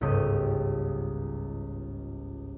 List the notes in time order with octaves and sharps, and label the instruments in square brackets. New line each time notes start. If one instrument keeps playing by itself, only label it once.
[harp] G1 C#2 G#2 G4 D#5